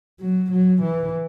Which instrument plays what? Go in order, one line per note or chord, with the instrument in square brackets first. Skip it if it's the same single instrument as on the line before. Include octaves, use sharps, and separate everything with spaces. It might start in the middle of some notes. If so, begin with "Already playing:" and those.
[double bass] F#3
F#3
E3